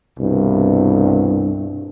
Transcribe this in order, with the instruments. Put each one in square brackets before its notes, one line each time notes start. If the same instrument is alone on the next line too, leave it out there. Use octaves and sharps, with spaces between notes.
[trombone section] C2 G2 B2